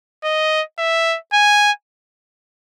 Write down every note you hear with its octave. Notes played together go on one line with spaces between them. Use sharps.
D#5
E5
G#5